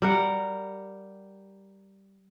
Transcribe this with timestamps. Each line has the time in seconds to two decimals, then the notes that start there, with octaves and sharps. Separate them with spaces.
0.02 G3 A#4 F#5